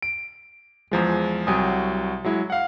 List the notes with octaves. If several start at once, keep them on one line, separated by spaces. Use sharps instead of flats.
D7
E2 F3 G#3
C2 F#3 G4 G#5 D#6
F#3 G#3 E4
F5 F#5